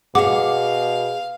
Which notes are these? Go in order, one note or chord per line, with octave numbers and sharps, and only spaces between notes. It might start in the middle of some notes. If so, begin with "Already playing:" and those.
B2 G#4 F5 F#5 D6